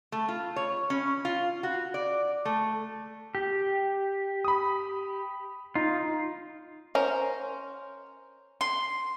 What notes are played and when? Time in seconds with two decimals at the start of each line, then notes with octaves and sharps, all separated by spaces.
0.12 A3
0.28 F4
0.56 C#5
0.90 C#4
1.25 F4
1.63 F#4
1.94 D5
2.45 A3
3.35 G4
4.45 B5 D#6
5.75 D#4 F4
6.95 C#4 A#4 C5
8.61 C6